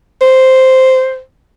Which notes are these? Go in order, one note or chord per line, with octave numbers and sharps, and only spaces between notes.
C5